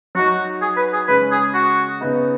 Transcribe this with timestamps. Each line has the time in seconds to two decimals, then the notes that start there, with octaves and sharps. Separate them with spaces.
0.15 F#3 D#4 F#4
0.62 G#4
0.77 B4
0.93 G#4
1.07 C#3 G#3 C#4 B4
1.31 G#4
1.55 F#4
2.01 C#3 B3 D#4